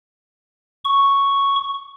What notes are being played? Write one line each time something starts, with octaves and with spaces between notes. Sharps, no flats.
C#6